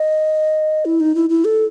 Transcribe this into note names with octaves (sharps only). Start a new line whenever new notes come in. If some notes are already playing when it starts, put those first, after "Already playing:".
Already playing: D#5
E4
D#4
E4
E4
A4